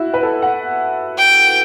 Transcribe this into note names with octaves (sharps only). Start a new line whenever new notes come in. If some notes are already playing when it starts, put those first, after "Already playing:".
Already playing: E4 F#4
B4
A4
F#5
G5